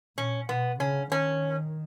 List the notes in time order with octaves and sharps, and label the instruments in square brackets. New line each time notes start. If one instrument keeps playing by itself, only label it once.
[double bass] A#2 [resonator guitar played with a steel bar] C#4
[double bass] B2 [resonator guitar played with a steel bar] B3
[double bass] C#3 [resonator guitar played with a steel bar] C#4
[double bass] D#3 [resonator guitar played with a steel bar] C#4